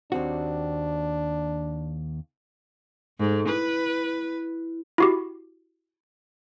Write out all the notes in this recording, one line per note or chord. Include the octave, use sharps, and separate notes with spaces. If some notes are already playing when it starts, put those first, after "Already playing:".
D#2 C4 D4 F#4
G#2 A4
E4 B4
E4 F#4 G4